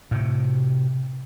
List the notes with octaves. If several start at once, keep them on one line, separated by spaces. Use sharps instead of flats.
A2 C3